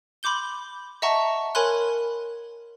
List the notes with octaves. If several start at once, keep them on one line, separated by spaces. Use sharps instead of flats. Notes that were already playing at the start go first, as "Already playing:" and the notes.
B5 C6 D6 G6 G7
D#5 E5 F#5 A5 A#5 C#6
A#4 C#5 G#5 B5 C6 F#6